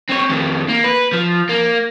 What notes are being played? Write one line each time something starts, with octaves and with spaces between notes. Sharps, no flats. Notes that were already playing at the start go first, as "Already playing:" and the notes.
C4 C#5
F2 D#3
A#3
B4
F3
A#3